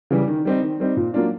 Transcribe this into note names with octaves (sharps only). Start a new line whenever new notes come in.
C#3 E3 G3
D#3
G3 C4 D#4
D#3
G3 C4 D#4
A#2
F#3 A#3 D4 F4